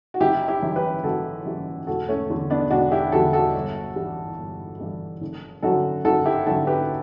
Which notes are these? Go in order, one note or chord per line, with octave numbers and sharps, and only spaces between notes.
F#4
F#1 E4 G4
E4 G4
F#2 E3 G3
G4 B4
F#1 F#4 A4
F#2 E3 G3
E1 F#4 A4
A3 C#4
E2 D3 G3
B3 D4
E1 D4 F#4
E4 G4
E2 D3 G3 F#4 A4
F#4 A4
G1
G2 E3 G3
G1
G2 E3 G3
F#1
F#2 D3 F#3 F#4 A4
F#1 F#4 A4
E4 G4
F#2 D3 F#3 F#4 A4
G4 B4